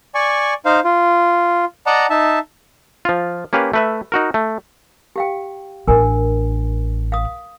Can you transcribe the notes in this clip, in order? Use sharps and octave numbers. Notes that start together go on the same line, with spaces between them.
D5 G#5 C#6
D#4 C5 F5
F4
D5 D#5 F#5 A5 A#5
D#4 E5 A5
F3 F4
A#3 C#4 G4 B4 F5
A3 B4 E5
D#4 F#4 A#4
A3
G4 F5 G5
A1 D4 A#4 G#5
F5 D#6